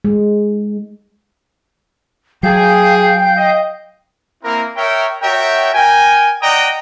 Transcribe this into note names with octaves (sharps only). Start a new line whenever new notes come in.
G#3
F#3 G#4 F5 G5 G6
D#5
A#3 C4 E4 A#4
A#4 C#5 E5 G5
F#4 A#4 C#5 E5 G5
A#4 G5 G#5
D5 D#5 F#5 G5 A#5 D#6